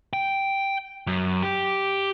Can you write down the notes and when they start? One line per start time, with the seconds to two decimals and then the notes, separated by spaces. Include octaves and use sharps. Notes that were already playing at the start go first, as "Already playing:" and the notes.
0.13 G5
1.07 F#2
1.43 G4